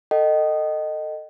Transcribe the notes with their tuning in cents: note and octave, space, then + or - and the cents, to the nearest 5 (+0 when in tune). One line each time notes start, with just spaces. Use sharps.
A4 +20 D#5 -10 G5 -40